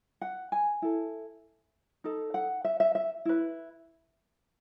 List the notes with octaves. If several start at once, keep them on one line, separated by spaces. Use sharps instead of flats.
F#5
G#5
E4 A4
D#4 A4
F#5
E5
E5
E5
E4 B4